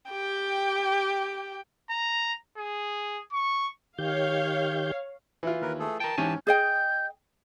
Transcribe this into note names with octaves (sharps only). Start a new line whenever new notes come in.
G4 G5
A#5
G#4
C#6
D#3 G4 C#5 F5 G6
E3 E4 F4
D#2 A#4 B4
A3 G#4 A4
A#4 G5 A5
G#2 E3 C#4 G4 G#5
G#4 D#5 G5 G6